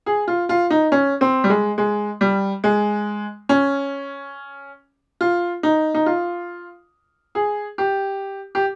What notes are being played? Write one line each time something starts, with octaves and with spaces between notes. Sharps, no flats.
G#4
F4
F4
D#4
C#4
C4
G3
G#3
G#3
G3
G#3
C#4
F4
D#4
D#4
F4
G#4
G4
G4